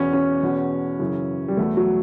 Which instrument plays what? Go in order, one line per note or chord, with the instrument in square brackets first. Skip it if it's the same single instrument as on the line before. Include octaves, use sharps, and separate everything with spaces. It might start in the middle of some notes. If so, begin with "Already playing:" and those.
Already playing: [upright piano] E2 B2 C#4
C#4
E2 B2
F#2 C#3 E3
G3
E2 B2 A3
F#3